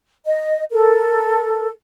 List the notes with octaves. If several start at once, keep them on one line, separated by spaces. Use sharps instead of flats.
D#5
A4 A#4